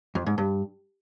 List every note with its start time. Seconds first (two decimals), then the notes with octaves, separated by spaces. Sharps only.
0.15 F2
0.26 G#2
0.38 G2